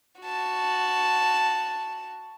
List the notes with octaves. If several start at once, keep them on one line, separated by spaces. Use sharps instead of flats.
F#4 A5